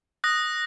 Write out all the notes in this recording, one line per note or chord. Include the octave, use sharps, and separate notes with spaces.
D#6 F#6 A#6